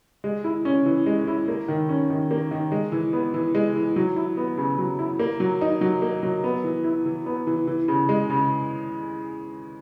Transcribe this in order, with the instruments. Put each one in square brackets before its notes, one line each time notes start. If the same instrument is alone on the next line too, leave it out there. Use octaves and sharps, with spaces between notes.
[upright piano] G#3
E4
C#4
E3
G#3
E4
A#3
D#3
C#4
D#3
A#3
D#3
G#3
E3
B3
E3
G#3
E3
F#3
E4
B3
C#3
F#3
E4
A#3
F#3
D#4
F#3
A#3
F#3
B3
E3
E4
E3
B3
E3
E3
C#3
G#3
C#3